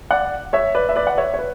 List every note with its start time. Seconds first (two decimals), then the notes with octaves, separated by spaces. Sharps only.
0.11 D5 F#5
0.53 C#5 E5
0.75 B4 D5
0.89 E5
0.96 B4 D5
1.07 F#5
1.18 C#5 E5
1.34 C#5
1.39 B4